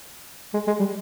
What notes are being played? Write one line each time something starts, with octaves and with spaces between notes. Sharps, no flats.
G#3
G#3
G3